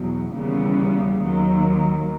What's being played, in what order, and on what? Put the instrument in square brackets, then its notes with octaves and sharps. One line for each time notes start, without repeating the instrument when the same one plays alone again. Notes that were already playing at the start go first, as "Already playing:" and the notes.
Already playing: [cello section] E2 B2 F#3
D#2 C#3 E3 G3 B3
D#2 D#3 F#3